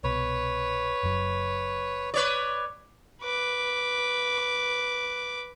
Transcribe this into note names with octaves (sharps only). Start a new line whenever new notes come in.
C2 B2 B4 C#5
F#1 F#2 F#3
B4 C#5 D5
B4 D6